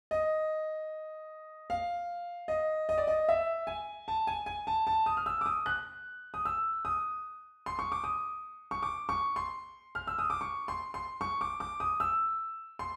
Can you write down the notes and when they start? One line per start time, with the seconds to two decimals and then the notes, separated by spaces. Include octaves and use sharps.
0.11 D#5
1.70 F5
2.48 D#5
2.89 D#5
2.98 D5
3.07 D#5
3.29 E5
3.67 G#5
4.08 A5
4.27 G#5
4.46 G#5
4.67 A5
4.87 A5
5.06 D#6
5.17 F6
5.26 E6
5.41 D6
5.46 D#6
5.66 F#6
6.34 D#6
6.45 E6
6.85 D#6
7.66 C6
7.79 C#6
7.92 D6
8.04 D#6
8.71 C#6
8.83 D6
9.09 C#6
9.36 C6
9.95 F6
10.07 E6
10.19 D#6
10.30 D6
10.41 C#6
10.68 C6
10.94 C6
11.21 C#6
11.41 D6
11.60 D6
11.80 D#6
12.00 E6
12.79 C6